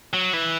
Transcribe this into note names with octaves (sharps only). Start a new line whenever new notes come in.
F#3
E3